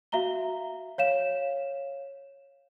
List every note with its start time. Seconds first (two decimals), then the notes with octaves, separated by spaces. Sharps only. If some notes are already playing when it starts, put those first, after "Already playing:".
0.12 F#4 E5 F5 A#5 G7
0.98 C#5 F5 E7